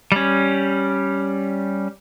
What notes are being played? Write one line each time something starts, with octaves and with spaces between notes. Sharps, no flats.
G3 C#4